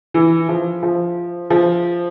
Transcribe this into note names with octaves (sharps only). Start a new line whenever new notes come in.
E3
F3
F3
F3